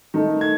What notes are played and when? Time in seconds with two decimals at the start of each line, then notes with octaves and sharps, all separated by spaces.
0.14 D#3 A3 D#4
0.41 G#6